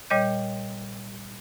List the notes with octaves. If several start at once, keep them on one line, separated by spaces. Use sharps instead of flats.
A#2 G3 C#5 D#5 G6